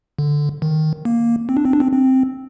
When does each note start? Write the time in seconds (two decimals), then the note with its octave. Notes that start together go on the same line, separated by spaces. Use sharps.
0.19 D3
0.62 D#3
1.05 A#3
1.49 C4
1.57 D4
1.65 C4
1.73 D4
1.80 C4
1.92 C4